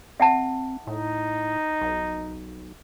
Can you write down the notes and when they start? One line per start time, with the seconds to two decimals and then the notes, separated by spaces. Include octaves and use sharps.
0.20 C4 E5 F#5 A5
0.87 A2 D#4
1.82 B1